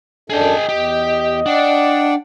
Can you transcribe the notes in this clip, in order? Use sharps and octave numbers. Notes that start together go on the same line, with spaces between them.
F#2 D4 G#4 A4 D#5 G5
E2 G4
D4 D5 F#5 G5